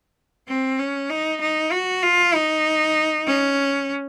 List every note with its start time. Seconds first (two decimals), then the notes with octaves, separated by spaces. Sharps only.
0.48 C4
0.79 C#4
1.10 D#4
1.41 D#4
1.72 F#4
2.03 F4
2.34 D#4
3.26 C#4